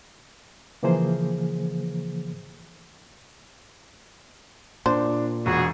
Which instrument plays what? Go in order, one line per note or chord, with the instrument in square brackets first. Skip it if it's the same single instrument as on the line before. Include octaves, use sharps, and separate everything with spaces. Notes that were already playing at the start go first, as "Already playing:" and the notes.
[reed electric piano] C#3 E3 F3 A#3 G#4 C5
[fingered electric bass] A#2 [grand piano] D4 [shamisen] C5
[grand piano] E1 [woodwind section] F#4 G#4